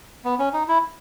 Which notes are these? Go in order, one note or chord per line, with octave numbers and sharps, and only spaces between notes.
B3
C#4
D#4
E4